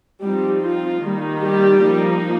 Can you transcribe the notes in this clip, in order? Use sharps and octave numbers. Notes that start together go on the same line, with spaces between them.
F3 G3 C4 D#4 G4
F4
D#3 G3 A#3 D#4
G3 G4
F3 A#3 D#4